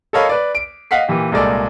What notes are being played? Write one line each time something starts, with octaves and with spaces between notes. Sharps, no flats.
A4 A#4 C#5 D#5 F5 B5
B4 D5
D7
D#5 F5 F#5 B6 C7
A#2 E3 G4
C2 A#2 G#3 A4 D5